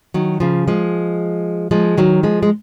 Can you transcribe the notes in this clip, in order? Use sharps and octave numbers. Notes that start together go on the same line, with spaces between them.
D#3 F#3
C#3 F3
F3 G#3
F3 G#3
D#3 F#3
F3 G#3
G#3